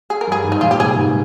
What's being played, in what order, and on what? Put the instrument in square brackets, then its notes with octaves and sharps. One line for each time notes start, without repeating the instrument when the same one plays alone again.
[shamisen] G#4
A#4
[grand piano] G2 [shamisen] G#4
[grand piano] G#2
[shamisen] D#4
[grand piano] A#2 [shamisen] F4
[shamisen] G4
[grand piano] C3 [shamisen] G#4
[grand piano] G#2